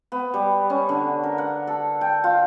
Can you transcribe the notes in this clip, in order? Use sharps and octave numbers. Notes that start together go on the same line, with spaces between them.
B3
G3
C#4
D3
A#4
F#5
A4
G5
F4